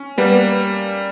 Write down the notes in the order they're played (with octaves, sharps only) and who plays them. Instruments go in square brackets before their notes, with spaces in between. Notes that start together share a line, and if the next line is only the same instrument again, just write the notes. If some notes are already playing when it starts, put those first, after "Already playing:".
Already playing: [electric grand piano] C#4
[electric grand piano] G3 A#3 [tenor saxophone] B3